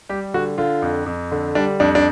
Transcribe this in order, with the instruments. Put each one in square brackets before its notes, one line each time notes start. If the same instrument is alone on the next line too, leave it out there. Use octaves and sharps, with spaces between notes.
[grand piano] G3 G4
D3 F#4
D3 F4
F2
F2
D3
G3 D4
F2 D4
D4